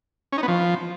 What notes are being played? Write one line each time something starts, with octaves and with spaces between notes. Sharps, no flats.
C#4
D#4
B3
F3